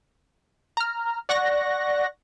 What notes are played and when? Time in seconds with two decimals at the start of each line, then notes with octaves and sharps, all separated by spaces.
0.77 A#5 F6
1.29 D5 F#5 C#6 F#6 A#6